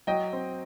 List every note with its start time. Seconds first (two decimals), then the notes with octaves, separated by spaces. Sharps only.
0.07 F#3 D#5 G5
0.33 C4